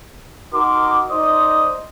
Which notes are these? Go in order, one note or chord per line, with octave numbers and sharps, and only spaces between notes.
D#4 F#4 A#4 C6 D6
D#4 C5 D5 D#5 C6 D#6